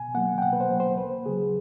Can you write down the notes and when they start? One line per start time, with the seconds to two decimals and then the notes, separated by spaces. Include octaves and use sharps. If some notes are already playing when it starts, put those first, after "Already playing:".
Already playing: B2 G#5
0.15 F#3 A#3 F#5
0.38 G5
0.42 B2 F#5
0.53 B4
0.60 C5
0.70 F#3 A#3
0.80 C5
0.97 D#2 B4
1.26 C#3 F#3 G#4